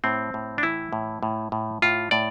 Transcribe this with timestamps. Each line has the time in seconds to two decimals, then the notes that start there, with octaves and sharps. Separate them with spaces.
0.04 A2 C4
0.34 A2
0.58 D4
0.63 E3 E4
0.93 A2
1.23 A2
1.52 A2
1.82 A2 F4
2.11 A2 D5